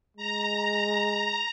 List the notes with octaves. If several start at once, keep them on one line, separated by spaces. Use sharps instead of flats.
G#3 A#5